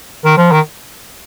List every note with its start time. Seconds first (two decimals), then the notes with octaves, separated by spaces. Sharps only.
0.25 D#3
0.38 F3
0.52 D#3